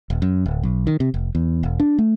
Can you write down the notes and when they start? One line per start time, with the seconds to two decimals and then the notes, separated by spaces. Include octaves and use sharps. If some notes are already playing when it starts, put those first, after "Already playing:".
0.10 D#1
0.22 F#2
0.46 D1
0.63 B1
0.87 D#3
1.00 C3
1.14 F1
1.35 E2
1.63 E1
1.80 D4
1.99 A3